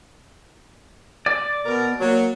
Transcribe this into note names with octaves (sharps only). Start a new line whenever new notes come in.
D5
B2 B3 A#4
F#3 A#3